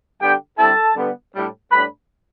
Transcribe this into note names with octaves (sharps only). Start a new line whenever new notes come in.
D3 G3 B3 D4 G4 G5
D3 G3 C4 E4 A4 A5
D3 G3 B3
A2 G3 D4
A2 G3 D4 B4 B5